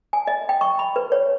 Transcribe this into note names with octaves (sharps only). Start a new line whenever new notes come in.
G#5
D#5
G5
C#6
B5
B4
C#5